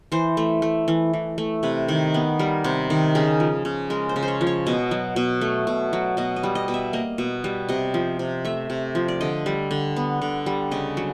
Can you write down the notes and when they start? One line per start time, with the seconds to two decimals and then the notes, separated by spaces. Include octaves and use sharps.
0.12 E3 C5
0.37 A3
0.62 A3
0.88 E3
1.13 E3
1.38 A3
1.63 C3 B4
1.88 D#3
2.14 B3
2.39 G3 A#4
2.64 C3
2.90 D#3
3.15 C#3 G#4
3.40 F3
3.65 C#3
3.90 G#3 A#4
4.09 C5
4.16 C#3
4.23 C5
4.28 C#5
4.41 F3
4.47 C#5
4.66 B2 D#5
4.91 F#3
5.16 B2
5.41 A3
5.67 B2
5.93 F#3
6.17 B2 D#5
6.36 D#5
6.43 G3
6.55 D#5
6.68 B2
6.74 E5
6.93 A#3 D#5
7.18 B2
7.44 G3
7.69 C3 D#5
7.94 F3
8.19 C3
8.45 A3 E5
8.70 C3
8.95 F3
9.08 D5
9.21 D3 D#5
9.46 G3
9.71 D3
9.96 B3
10.22 D3
10.46 G3
10.71 C#3 D#5
10.97 F#3